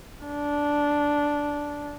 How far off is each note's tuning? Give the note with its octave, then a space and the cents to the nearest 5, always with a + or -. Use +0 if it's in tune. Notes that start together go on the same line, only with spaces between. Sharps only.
D4 -10